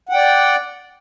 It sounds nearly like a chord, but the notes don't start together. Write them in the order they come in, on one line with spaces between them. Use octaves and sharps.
F#5 G5 D5